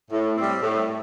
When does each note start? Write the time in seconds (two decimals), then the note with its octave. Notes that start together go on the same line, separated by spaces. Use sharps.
0.11 A2
0.37 G3 C4
0.62 A2